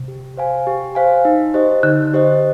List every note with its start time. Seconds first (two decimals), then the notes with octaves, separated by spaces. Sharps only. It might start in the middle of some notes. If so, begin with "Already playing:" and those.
Already playing: C3
0.08 G4
0.37 C5 F5 G#5
0.67 G4
0.95 C5 F5 G#5
1.25 D#4
1.54 G4 C5 D#5
1.83 D3 D#4
2.14 G4 C5 D#5